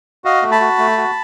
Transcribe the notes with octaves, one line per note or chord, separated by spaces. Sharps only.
F#4 D#5 F5
A3
A5 B5
F#4
A3
F#4